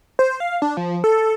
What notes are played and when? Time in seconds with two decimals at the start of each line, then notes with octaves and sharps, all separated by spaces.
0.19 C5
0.40 F5
0.62 D4
0.77 F3
1.04 A4